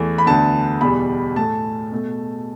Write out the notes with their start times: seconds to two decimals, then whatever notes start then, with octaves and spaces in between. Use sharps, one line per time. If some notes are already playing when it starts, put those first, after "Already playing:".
Already playing: E2 E3 A3
0.18 B5
0.26 D2 D3 B3 A5
0.81 E2 B2 G3 B5
1.36 A2 A3 A5
1.92 B2 A3